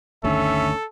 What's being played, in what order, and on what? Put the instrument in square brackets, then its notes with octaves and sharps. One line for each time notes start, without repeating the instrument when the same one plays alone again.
[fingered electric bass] G1 D2 D#3 [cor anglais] C#4 [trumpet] A4 [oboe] E5